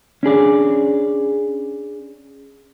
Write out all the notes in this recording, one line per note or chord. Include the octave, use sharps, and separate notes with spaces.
C#4 D4 G#4 D5